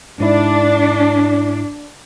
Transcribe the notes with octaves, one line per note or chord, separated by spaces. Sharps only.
G#2 D4 E4